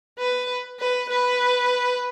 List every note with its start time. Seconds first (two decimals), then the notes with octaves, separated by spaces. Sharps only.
0.19 B4
0.79 B4
1.09 B4